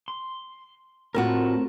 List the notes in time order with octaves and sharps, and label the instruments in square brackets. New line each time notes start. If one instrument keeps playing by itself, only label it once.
[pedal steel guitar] C6
[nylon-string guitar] A2 F4 F#4 [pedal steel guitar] A3 C4 A#4